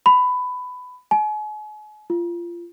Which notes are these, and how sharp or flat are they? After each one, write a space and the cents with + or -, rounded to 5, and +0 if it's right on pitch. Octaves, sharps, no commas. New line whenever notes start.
B5 +15
G#5 +40
F4 -25